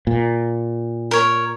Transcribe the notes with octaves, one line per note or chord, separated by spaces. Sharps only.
A#2
A#4 C#5